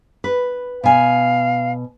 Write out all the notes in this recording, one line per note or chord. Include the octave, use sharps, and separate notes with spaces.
B4
B2 F5 G#5